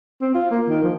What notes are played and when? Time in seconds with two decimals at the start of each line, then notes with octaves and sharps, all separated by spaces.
0.22 C4
0.35 F4
0.51 A#3
0.69 D#3
0.83 F3